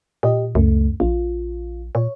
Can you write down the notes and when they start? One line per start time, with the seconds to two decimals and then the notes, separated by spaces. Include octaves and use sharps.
0.23 A#2 G4 D#5
0.55 C#2 F#2 A3
1.00 A#1 F4
1.95 A#2 C#5